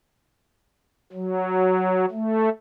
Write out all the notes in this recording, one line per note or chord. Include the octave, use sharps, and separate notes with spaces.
F#3
A3